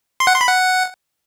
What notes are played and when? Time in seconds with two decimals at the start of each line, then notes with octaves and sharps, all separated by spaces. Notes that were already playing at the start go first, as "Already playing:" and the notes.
0.20 C6
0.27 F#5
0.34 C6
0.41 B5
0.48 F#5